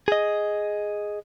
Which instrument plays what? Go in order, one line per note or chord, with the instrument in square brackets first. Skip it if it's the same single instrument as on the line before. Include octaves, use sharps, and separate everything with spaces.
[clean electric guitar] G#4 D#5